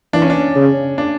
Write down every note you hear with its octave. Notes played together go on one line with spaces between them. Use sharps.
E3 D4
C#4
D4
C#3
D4